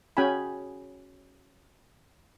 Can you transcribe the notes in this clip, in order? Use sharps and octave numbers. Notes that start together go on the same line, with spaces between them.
C#4 F#4 G#4 G5 G#5 B5